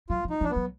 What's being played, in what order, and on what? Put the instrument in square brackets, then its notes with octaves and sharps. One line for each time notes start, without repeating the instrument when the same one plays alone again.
[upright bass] F#3 [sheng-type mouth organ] F4
[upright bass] F3
[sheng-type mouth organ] D#4
[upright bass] F3 [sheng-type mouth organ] D4
[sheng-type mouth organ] B3
[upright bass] F#3